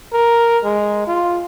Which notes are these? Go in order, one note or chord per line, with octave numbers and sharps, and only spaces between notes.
A#4
G#3
F4